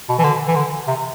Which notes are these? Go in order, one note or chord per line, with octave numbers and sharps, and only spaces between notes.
B2
E3
D3
E3
D3
C3